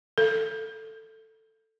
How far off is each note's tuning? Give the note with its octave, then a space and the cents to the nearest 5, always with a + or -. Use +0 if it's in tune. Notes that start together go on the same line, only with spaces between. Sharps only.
A4 +5